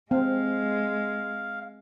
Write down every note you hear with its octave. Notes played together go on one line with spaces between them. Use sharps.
G#3 C4 F5